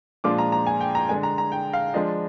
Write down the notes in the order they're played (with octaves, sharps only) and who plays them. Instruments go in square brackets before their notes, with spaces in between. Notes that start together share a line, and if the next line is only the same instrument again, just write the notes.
[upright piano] A#2 F3 G#3 D4 F4 D6
A#5
A#5
G#5
G5
A#5
D3 G#3 D4 G#5
A#5
A#5
G5
F5
F3 G#3 D4 F4 D#5